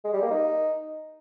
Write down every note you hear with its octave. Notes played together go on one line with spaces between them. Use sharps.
G#3
G3
A#3
D#4